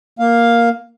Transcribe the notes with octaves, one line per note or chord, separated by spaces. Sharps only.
A#3 F5